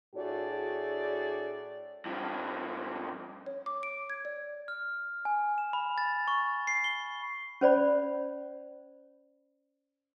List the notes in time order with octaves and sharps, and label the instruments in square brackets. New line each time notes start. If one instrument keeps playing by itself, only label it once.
[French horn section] A2 D4 F#4 G#4 D5
[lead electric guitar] G2 F3
[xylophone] C#5
D6
D7
G#6
D5
[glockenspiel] F6
G#5
E7
B5
A6
C#6
C7
G7
[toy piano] C#4 C5 D5 B5